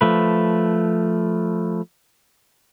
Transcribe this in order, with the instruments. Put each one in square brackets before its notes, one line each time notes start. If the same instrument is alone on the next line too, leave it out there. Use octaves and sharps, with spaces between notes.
[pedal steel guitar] F3 A3 B4